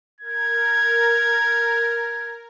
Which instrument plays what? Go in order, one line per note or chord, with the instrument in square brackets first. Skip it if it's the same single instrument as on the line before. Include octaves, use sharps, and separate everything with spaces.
[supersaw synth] A#4 [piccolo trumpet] G#6